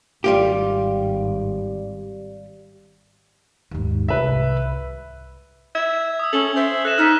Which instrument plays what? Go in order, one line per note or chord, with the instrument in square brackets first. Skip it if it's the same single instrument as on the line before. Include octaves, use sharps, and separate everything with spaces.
[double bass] G#1 [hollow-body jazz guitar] G3 F4 G4
[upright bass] D#2 G#2
[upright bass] C2 [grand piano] B4 E5
[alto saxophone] E5 [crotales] G#6
[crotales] D#6 E6
[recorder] C#4 [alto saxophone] A4 [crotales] F#7 G7
[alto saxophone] C5 [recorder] E5
[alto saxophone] A4 [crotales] F#6 A#6 E7
[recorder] D#4 [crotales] F6 B6